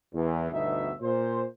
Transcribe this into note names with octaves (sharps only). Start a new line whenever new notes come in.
E2
G1 D2 B2 D#4 E5
A#2 C5